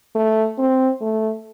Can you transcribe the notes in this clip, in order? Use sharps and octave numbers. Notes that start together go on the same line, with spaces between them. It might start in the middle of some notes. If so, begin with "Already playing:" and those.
A3
C4
A3